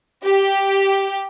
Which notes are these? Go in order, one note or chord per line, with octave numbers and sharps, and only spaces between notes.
G4